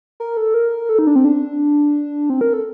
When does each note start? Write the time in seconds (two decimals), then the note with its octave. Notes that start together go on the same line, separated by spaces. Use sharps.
0.20 A#4
0.37 A4
0.54 A#4
0.89 A4
0.99 D#4
1.07 D4
1.16 C4
1.25 D4
2.30 C4
2.41 A#4
2.53 A4